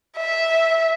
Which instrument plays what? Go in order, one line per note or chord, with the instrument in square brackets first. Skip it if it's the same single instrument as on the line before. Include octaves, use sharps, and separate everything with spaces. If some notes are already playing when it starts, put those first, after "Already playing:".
[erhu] E5